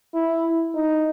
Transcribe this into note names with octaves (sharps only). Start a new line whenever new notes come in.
E4
D#4